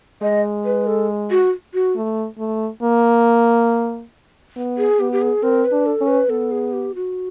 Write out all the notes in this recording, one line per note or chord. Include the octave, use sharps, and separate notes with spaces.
G#3 D#5
B4
A4
F#4
F#4
A3
A3
A#3
B3
G#4
B3 G4
G4
G#4
C4 A#4
B4
D4
A4
C#4
B4
B3 A4
G#4
G4
F#4